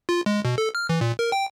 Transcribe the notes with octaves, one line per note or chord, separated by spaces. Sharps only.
F4
G#3
B2
A4
F6
E3
A#2
A#4
G5